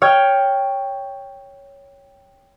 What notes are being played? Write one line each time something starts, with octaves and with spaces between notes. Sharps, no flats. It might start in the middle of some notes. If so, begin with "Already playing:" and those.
C#5 G5 F6